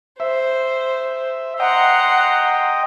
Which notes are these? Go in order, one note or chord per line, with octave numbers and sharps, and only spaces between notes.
C5 E5
D#5 F#5 G5 A#5 C6